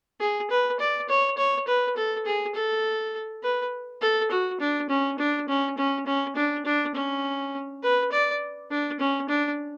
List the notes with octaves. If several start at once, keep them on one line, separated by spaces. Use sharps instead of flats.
G#4
B4
D5
C#5
C#5
B4
A4
G#4
A4
B4
A4
F#4
D4
C#4
D4
C#4
C#4
C#4
D4
D4
C#4
B4
D5
D4
C#4
D4